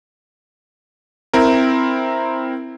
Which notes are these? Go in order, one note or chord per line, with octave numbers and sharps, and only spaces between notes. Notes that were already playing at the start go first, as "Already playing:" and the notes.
C4 E4 A#4